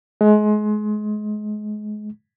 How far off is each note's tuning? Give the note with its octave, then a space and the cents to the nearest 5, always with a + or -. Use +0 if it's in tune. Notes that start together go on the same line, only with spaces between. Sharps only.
G#3 +30